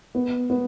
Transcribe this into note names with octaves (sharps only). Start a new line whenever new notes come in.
B3
B3